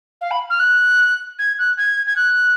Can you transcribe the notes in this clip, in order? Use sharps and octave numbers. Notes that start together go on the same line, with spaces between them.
F5
B5
F6
F#6
G#6
F#6
G#6
G#6
F#6